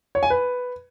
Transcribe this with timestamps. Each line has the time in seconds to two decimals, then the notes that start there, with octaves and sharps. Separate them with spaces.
0.15 C#5
0.23 G#5
0.30 B4